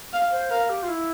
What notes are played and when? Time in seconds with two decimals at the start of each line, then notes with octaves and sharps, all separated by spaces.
0.13 F5
0.31 C5
0.51 A#4 F5
0.70 G4
0.83 F4
0.89 E4